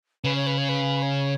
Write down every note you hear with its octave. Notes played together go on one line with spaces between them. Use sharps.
C#3 B4
C#5
B4
C#5
B4
C#5